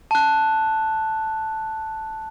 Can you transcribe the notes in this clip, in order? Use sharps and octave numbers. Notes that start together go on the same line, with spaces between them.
A5 F#6